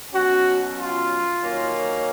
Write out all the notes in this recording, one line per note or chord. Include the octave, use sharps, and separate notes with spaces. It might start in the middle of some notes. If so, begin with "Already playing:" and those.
B2 F#3 C#4 F#4
F4
D#3 F#3 A#3 C#4